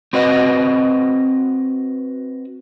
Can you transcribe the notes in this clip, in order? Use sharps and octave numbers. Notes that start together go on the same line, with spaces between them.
C4 F#4 B4 D#5 F#5